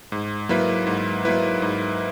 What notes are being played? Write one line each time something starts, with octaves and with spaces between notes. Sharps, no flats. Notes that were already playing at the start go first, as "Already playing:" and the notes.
G#2
F#3 A#3 E4 B4
G#2
F#3 A#3 E4 B4
G#2